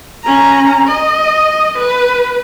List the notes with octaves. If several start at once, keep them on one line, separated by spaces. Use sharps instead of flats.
C#4 A#5
D#5
B4